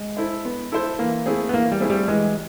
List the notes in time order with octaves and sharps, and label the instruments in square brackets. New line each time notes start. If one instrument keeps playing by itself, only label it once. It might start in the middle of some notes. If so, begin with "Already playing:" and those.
Already playing: [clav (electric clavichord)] G#3
[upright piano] E4 A4 C5
B3
E4 A4 C5
[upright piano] E3 [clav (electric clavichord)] A#3
[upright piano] A3 C4 E4 G#4
[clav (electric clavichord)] B3
[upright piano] E3 [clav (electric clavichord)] A#3
[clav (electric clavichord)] G3
[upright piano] A3 C4 E4 G#4
[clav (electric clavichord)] G3
[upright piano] E3 [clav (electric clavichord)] G#3